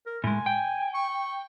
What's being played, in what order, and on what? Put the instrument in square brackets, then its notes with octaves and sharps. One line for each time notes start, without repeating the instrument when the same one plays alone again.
[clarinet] A#4
[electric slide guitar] A2 G#3 [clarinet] G#5
[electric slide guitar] G5
[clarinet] C#6